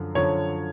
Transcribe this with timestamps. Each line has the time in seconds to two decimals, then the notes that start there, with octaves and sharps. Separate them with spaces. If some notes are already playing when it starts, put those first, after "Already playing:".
Already playing: F#2 D3 F3
0.15 F#2 D3 F3 C#5